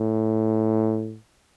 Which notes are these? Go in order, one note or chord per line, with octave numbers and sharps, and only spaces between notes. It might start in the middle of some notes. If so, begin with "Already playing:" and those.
Already playing: A2